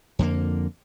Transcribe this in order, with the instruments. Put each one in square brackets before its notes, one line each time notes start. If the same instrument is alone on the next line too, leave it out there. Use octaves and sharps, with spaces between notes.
[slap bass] F2 D3 A#3